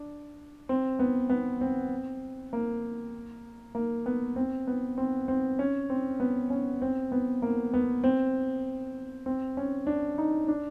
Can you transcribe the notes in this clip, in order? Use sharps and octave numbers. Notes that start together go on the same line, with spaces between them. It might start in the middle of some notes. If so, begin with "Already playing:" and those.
Already playing: D4
C4
B3
B3
C4
A#3
A#3
B3
C4
B3
C4
C4
C#4
C4
B3
C#4
C4
B3
A#3
B3
C4
C4
C#4
D4
D#4
D4